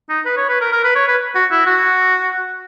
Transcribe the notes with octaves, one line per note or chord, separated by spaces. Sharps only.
D#4
B4
C#5
B4
A#4
A#4
B4
C#5
B4
F#4
E4
F#4